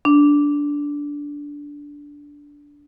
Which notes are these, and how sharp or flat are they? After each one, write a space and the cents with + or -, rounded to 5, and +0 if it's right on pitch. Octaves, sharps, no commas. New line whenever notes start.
D4 -15